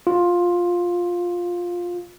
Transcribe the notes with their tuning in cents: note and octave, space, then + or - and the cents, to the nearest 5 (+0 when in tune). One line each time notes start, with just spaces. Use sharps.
F4 +10